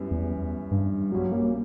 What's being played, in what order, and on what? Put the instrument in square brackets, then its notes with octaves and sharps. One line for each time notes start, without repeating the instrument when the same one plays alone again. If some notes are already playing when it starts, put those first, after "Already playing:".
Already playing: [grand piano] F#2 E3 G3 B3
[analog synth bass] E2
G2
[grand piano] A#1 A#2 G3 C#4 [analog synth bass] F#3
[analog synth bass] A#3